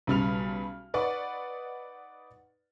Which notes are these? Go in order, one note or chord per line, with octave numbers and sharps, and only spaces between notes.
B1 C#3 G3 B5 F6 F7
D#4 B4 D5 F#5 C#6